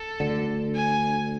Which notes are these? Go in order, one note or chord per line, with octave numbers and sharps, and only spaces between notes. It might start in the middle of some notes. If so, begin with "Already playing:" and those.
Already playing: A4
D2 D3
G#5